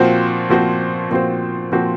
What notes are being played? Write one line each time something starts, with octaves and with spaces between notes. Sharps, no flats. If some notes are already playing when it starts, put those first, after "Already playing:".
Already playing: A#2 F3 C4 F#4 C5
A#2 F3 C4 F#4 C5
A#2 F3 C4 F#4 C5
A#2 F3 C4 F#4 C5